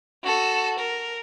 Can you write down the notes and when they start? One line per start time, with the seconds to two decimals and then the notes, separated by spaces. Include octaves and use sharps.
0.23 F#4 A4
0.78 A#4